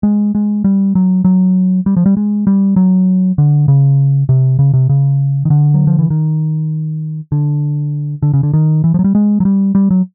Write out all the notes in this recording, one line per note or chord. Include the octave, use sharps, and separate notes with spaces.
G#3
G#3
G3
F#3
F#3
G3
F3
G3
G#3
G3
F#3
D3
C#3
C3
C#3
C3
C#3
D#3
D3
F#3
F3
E3
D#3
D3
D3
C#3
D3
D#3
E3
F3
F#3
G3
G#3
F#3
G3
G3
F#3